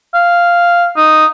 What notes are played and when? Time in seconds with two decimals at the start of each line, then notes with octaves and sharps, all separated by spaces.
0.14 F5
0.97 D#4